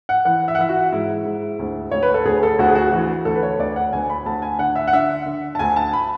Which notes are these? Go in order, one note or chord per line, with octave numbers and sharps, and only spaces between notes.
F#5
E3 F#5
E5
F#5
E3 E5
F#4
G#2 E4
G#2
D2
D2 C#5
B4
A4
D2 G#4
A4
D2 F#4
G#4
F#4
E3 F#4
D2 A4
B4
C#5
D2 D5
F#5
D2 G#5
B5
D2 A5
G#5
D3 F#5
E5
F#5
D3 E5
D3
A5
D2 G#5
A5
B5